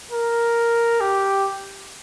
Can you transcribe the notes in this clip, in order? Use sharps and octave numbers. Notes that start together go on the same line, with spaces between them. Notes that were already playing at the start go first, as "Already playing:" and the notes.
A#4
G4